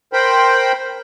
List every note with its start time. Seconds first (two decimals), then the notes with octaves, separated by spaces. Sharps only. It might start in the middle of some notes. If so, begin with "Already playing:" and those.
0.13 A#4 C5 G5 B5